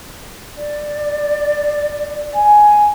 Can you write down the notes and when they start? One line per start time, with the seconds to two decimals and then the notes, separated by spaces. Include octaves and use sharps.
0.57 D5
2.36 G#5